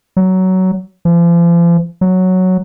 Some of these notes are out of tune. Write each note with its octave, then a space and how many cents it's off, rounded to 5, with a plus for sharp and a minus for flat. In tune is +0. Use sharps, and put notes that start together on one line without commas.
F#3 +15
F3 -40
F#3 +0